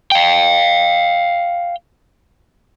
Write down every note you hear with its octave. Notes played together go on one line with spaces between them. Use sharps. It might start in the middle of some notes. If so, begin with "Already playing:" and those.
F5 G5